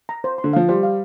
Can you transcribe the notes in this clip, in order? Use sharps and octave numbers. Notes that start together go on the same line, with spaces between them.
A#5
C5
C6
D3
F3 F5
G3 C5
F5